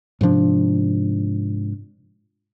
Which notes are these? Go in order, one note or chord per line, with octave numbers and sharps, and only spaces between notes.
G#2 C3 F3 D4